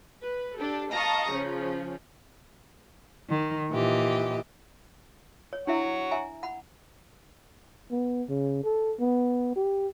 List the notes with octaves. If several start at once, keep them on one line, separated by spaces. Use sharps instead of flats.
B4
D4 G4 A4
D#5 F5 A5 A#5 C#6 D#6
C#3 F3 C#4
D#3
A#2 E3 G4 D#5
C#5
D4 E4 C#5 E5 F#5
E5 G#5 A#5
F#5 B5
B3
C#3
A4
B3
G4